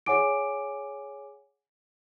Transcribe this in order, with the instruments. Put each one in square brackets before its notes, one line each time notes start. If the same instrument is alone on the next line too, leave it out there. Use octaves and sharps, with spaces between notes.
[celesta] G#4 C#5 F#5 G#5 D6 D7